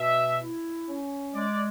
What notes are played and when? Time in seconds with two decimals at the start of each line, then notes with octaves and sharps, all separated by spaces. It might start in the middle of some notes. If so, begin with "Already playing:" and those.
Already playing: B2 E5
0.41 E4
0.88 C#4
1.34 G#3 D5